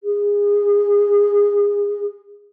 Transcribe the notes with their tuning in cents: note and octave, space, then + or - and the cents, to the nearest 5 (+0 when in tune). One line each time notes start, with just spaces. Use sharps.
G#4 -25